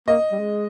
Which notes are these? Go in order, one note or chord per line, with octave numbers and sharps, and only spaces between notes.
A#3 D#5
G3
G#3